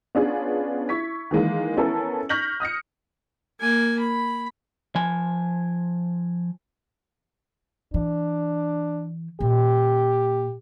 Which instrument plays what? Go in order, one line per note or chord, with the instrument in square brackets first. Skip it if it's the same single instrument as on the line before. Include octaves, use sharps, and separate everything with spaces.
[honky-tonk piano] B3 C#4 D4 F4 G#4 B4
E4 C#6 G#6 B6
D#3 E3 G#3 A#3
B3 C#4 E4 A4 A#4 G#5
C#6 F6 G6 A#6 B6 F#7
D#6 F6 A#6 C#7
[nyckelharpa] A#3 G#5
B5
[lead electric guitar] F3 G#5
[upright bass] E3 [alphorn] D4
[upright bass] A#2 [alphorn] G4